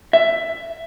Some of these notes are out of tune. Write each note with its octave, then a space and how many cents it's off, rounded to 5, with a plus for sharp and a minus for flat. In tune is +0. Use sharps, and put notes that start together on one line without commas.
E5 +15